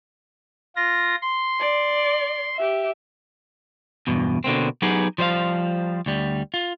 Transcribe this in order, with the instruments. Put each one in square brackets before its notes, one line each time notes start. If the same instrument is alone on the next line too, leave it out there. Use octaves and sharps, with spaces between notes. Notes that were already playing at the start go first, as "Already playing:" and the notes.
[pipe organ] F4 A#6
C6
[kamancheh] D5
G4 E5
[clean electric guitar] E2 G2 B2
B2 D3 A#3 C4
F#3 B3 D#4 G4 G#4
F3 G3 C5 D#5 F5
D2 G3
F4